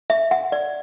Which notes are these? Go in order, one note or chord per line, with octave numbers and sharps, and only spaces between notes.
E5
F#5
D5